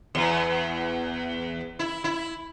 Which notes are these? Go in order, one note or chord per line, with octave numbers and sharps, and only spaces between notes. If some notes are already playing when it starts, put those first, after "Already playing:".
E2
E4
E4